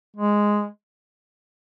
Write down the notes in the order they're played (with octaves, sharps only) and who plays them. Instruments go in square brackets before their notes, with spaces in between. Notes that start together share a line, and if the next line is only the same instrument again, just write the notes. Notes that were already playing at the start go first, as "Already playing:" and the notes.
[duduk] G#3